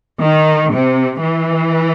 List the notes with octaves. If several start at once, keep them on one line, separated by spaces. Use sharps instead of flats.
D#3
C3
E3